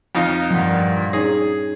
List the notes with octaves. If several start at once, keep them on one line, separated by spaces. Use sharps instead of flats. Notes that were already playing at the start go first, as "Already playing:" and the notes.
F2 D#4 F4
G2 A#2 F3 F#5
C#4 D#4 G#4 C#5